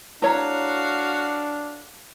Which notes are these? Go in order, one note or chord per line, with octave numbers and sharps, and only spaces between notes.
A3 D4 E4 F#4 C#5 F5 A#5